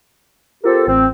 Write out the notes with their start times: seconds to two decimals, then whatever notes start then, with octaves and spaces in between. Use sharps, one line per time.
0.64 C4 F4 G4 A4 A#4
0.87 A1 C4